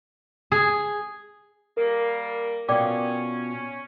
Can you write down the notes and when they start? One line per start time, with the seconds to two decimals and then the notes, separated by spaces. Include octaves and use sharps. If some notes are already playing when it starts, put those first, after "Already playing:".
0.52 G#4
1.77 G3 A#3 A#4
2.69 B2 C#4 F4 D5 G5 D6